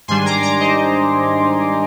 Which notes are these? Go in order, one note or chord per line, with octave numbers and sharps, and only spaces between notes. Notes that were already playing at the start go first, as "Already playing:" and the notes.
G#2 D#3 G3 D4 G#5 C6
A#5 D6
A#5 D6
C5 D#5